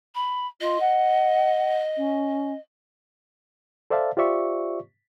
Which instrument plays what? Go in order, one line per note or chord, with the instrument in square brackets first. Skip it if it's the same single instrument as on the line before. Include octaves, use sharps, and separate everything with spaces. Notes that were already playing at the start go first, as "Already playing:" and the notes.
[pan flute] B5
[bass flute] F4 [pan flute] D#5
[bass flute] F#5
C#4
[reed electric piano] A4 C5 D5 E5 F5 A5
F4 G4 C5 D5 E5 C#6